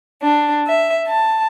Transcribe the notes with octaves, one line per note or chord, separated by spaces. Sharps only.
D4
E5
A5